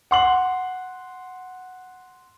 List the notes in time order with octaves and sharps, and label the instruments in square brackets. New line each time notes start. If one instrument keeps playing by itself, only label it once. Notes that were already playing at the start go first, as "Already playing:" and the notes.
[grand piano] F#5 C6 F#7